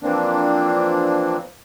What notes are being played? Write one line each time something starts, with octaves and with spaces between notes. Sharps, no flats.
E3 F3 A#3 C4 D4